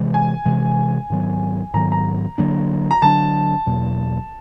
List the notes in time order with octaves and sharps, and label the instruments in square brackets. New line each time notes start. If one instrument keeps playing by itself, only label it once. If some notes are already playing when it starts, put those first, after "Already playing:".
Already playing: [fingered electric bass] C3 E3 G#3
[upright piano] G#5
[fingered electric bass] C3 E3 G#3
G#2 D#3 F#3 B3
[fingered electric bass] G#2 D#3 F#3 B3 [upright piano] A#5
[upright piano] A#5
[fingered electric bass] D3 F#3 A#3 D4
[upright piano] A#5
[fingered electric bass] D3 F#3 A#3 D4 [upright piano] A5
[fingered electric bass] E2 B2 F#3 A#3